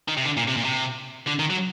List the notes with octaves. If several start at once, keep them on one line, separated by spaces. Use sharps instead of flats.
D#3
C3
D3
A#2
C3
A#2
C3
D3
D#3
F#3